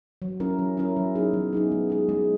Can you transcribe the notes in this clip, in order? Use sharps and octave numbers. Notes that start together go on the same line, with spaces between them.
F#3
C#4 E4 A#4
F#3
C#4 E4 A#4
F#3
B3 D#4 G#4
F#3
B3 D#4 G#4
G#3
D#4 G#4
G#3